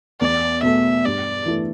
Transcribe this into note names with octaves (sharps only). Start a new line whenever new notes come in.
E2 D5
B2 A3 E5
G2 D5
E3 A3 E4